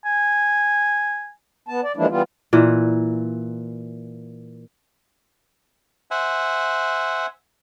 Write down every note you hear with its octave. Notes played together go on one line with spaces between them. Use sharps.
G#5
B3 A5
D5
E3 F3 G#3 A#3 D4 E4
E3 G3 B3 F4
A#2 E3
C5 E5 F#5 G#5